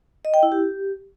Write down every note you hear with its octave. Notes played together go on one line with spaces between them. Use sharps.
D#5
G5
E4
G4